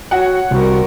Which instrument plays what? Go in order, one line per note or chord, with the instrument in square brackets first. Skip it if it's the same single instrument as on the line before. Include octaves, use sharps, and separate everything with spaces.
[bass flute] F#4 [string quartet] C#5 [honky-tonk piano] F#5
[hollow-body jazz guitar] C2 [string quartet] G3 C4 A#4 [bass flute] F#4